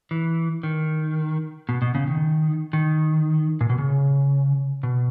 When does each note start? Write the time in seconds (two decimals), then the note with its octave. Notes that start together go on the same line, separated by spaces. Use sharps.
0.11 E3
0.63 D#3
1.69 B2
1.82 B2
1.95 C#3
2.07 D#3
2.73 D#3
3.61 A#2
3.70 B2
3.78 C#3
4.83 B2